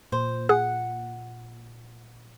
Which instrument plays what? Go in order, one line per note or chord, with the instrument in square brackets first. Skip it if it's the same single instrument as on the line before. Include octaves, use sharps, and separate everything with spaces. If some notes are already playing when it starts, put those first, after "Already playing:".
[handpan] A#2 [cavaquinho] C5
[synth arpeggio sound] G#4 [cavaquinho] F#5